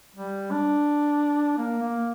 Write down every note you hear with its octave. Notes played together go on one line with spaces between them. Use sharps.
G3
D4
A#3
A#3